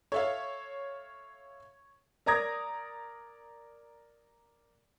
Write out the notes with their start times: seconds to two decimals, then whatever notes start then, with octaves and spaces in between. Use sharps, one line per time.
0.12 A4 C#5 E5 F5
2.26 A#4 D5 A#5 D#6 G#6 A#6